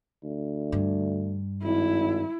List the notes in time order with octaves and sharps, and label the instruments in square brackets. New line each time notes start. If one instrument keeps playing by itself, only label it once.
[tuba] D2
[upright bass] G2
[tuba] G#1 [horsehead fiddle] E4